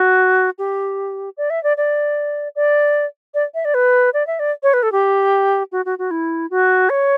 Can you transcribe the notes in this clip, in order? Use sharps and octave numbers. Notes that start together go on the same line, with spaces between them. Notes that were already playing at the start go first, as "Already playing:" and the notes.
Already playing: F#4
G4
D5
E5
D5
D5
D5
D5
E5
D5
B4
D5
E5
D5
C#5
B4
A4
G4
F#4
F#4
F#4
E4
F#4
C#5